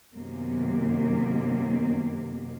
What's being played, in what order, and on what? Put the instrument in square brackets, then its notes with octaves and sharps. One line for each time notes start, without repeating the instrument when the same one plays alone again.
[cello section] F#2 C3 D#3 A#3 B3